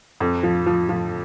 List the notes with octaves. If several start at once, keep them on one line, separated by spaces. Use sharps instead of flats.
F2
F3
F3
F3